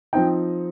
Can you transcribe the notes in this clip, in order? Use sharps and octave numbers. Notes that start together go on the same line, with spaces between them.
F3 C4 D#4 G5